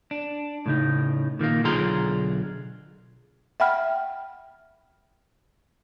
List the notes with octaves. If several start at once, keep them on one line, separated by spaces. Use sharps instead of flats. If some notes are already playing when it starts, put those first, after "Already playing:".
D4
A2 C#3 D#4
A#2 D#3 G3 A#3
B1 D3 F4 G#4 A#5 C6
E5 F#5 G5 B5 F6